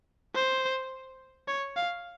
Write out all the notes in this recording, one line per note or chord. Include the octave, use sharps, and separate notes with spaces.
C5
C#5
F5